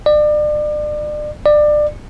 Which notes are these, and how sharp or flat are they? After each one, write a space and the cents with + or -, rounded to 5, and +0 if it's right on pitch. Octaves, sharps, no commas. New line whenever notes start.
D5 +35
D5 +25